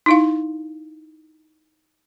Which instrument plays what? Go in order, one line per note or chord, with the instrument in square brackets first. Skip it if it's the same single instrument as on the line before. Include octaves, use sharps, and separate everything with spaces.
[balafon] D#4 E4 F5